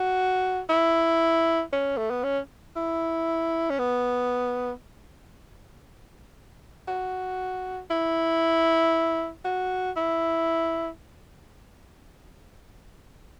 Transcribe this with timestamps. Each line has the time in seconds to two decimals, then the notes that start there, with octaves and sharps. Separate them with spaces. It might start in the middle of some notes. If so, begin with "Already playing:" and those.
Already playing: F#4
0.70 E4
1.73 C#4
1.97 A3
2.10 B3
2.24 C#4
2.76 E4
3.70 C#4
3.79 B3
6.88 F#4
7.91 E4
9.45 F#4
9.97 E4